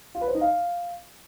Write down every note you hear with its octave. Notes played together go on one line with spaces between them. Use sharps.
F4
B4
C5
D#4
F5